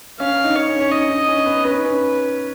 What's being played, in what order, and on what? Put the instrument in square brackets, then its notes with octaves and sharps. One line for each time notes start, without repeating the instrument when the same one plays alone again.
[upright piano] C#4 [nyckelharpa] F5
[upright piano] D#4
[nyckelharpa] C#5
[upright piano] C#4
C#4
[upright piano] D#4 [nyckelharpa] D#5
[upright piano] D#4
C#4
B3
[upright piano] C#4 [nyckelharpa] B4
[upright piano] D#4
C#4